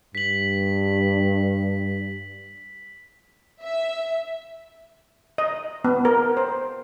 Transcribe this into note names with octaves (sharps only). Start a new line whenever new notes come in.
G2 B6 F#7
E5
D#5
B3
A#4
C5